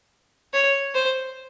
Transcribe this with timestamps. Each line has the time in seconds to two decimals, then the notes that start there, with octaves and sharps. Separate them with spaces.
0.53 C#5
0.95 C5